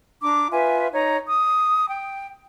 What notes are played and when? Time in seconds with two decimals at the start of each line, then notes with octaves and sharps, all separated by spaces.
0.22 D4 A#5 D6
0.51 F4 B4 E5 G#5
0.93 D#4 C#5 A#5
1.28 D#6
1.90 G5